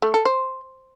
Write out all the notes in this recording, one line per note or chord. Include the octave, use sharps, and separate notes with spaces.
A3
A4
C5